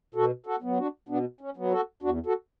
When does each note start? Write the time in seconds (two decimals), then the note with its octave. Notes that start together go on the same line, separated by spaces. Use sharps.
0.15 B2 F#4 A4
0.46 F#4 A4
0.62 F#3 B3
0.78 D4 F#4
1.09 B2 B3 D4
1.41 C#4
1.57 F#3 B3
1.72 F#4 A4
2.03 E2 D4 F#4
2.26 F#4 A4